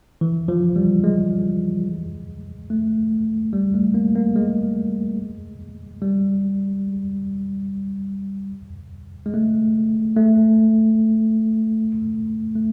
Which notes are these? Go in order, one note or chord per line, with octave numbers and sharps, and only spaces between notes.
E3
F3
G3
G#3
A3
G3
A3
A#3
A#3
G#3
G3
G#3
A3
A3
A3